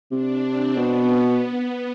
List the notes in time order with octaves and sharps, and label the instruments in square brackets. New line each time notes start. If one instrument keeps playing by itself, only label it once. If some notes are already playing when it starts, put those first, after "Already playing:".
[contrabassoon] C3 [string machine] D4
[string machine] C4
[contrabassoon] B2 [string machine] B3